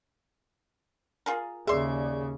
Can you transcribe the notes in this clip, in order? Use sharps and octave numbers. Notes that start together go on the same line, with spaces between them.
F4 G#4 A#4
D#2 C#3 G#4 D5 E5 C6